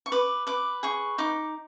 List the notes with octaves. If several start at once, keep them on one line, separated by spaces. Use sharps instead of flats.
C#6
B4 D6
B4 D6
G#4 C#6
D#4 D6